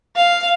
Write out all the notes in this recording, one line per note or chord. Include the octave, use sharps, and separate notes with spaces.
F5